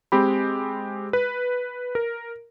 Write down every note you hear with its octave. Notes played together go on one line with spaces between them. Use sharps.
G#3 C4 G4 B5
B4
A#4